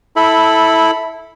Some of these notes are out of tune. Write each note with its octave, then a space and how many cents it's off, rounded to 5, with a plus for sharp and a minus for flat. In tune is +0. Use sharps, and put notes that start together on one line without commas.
E4 -10 A4 +0 B5 +0